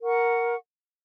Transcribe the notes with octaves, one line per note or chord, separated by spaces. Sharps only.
A#4 F#5 C#6